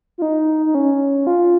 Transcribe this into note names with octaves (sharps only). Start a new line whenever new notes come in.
F4
D#4
D#4
C#4
F4